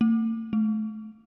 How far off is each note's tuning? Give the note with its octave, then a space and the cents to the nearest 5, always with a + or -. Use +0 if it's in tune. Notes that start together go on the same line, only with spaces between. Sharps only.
A3 +45
A3 -30